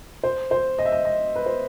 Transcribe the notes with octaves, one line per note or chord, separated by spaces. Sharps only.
C5
C5
D#5
E5
D#5
D#5
B4
C5